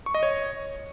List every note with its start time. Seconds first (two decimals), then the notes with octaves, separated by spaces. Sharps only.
0.06 C#6
0.14 D#5
0.23 C#5